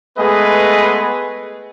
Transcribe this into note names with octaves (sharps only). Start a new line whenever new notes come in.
G#3 A3 B3 G#4 B4 D#5